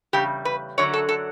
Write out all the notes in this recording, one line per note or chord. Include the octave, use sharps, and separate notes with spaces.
E2 C#3 G3 G4
B4
F#2 D3 F#3 C#5
A4
A4